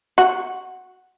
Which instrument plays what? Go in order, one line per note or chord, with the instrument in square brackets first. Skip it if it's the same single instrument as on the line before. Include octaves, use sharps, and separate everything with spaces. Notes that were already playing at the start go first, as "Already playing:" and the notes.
[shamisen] F#4